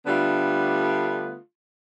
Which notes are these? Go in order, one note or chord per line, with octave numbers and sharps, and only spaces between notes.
D3 G3 A3 B3 D4 F4